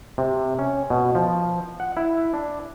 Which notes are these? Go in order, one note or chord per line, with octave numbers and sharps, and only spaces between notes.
C3
C#4
B2
F3
F#5
E4
D4